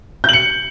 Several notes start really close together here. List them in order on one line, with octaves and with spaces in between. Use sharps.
G6 F#7 C#7